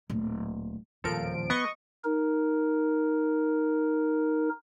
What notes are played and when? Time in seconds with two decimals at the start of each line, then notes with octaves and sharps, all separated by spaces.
0.10 D1 A#2
1.04 D#1 E2 A2 F3 A4 A#4 D7
1.50 B3 D#5 C#6
2.04 D#4 A#4